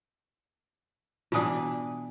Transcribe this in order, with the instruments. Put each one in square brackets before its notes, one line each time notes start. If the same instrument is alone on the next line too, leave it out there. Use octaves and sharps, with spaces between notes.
[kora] B2 E3 D4 [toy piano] F4 D#6